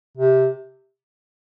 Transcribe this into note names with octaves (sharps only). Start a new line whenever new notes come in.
C3